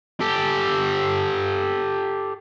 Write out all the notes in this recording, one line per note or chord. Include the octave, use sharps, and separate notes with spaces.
G4 A4